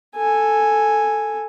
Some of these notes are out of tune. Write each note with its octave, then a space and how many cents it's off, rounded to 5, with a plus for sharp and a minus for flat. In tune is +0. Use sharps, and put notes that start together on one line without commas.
A4 +0 G#5 +0